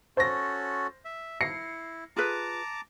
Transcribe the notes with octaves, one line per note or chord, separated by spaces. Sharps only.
C#4 F#4 A4 C5 A#6
E5
E4 A#6 C7 C#7
F4 G#4 B4 A5 A#5 D6